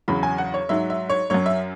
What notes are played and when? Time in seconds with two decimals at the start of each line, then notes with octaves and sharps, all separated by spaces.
0.08 E2 C#3 F#3 B5
0.23 G#5
0.38 F#5
0.54 C#5
0.69 G#2 F#3 E5
0.90 E5
1.09 C#5
1.30 F#2 F#3 C#5
1.46 E5